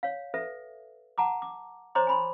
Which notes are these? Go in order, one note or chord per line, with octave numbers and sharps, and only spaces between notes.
C#5 F5
A4 B4 E5
F#5 A5 A#5 D6
D6
C5 C#5 D#5 A#5 C6 D6
G#5 B5 C6